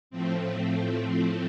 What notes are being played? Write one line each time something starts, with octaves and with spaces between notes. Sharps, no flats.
A2 F3 A3 C4